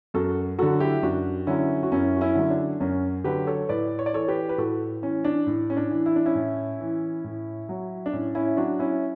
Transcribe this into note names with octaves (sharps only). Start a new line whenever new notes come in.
F#2 F#4 A4
D3 F#3 F#4 A4
E4 G4
F#2 D4 F#4
D3 F#3 C#4 E4
F#4
F#2 C#4 E4
F#4
C#4 E4
D3 F#3 C#4
D4
F#2 C#4
D3 F#3 G4 B4
A4 C#5
A2 B4 D5
C#5
D5
E3 A4 C#5
G4 B4
B4
A2 F#4 A4
E3 C#4
D4
A2
C#4
D4
E3
E4
D4
C#4 E4
A2
E3
A2
F#3
D4
A2 C#4
C#4 E4
F#3 D4 F#4
C#4 E4